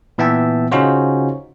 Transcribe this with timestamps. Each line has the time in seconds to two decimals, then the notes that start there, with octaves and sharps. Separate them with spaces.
0.18 A#2 E3 B3 E5 G5 A5
0.72 C#3 C#4 D#4 F4 F#4 C5